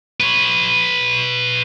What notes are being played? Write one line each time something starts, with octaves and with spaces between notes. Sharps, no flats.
B4 C#5